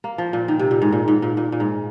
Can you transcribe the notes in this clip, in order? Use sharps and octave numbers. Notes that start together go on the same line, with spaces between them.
A#3
F3
A#2
D#3
C3
A#2
G#2
A#2
G#2
A#2
A#2
A#2
G#2